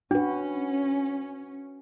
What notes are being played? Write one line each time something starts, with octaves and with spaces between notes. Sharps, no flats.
C#4 D4 F#4 B4